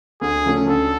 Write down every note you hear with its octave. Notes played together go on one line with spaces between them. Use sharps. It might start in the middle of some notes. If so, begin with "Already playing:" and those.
D2 G#4
C#3 F3 A3 C#4
D2 A4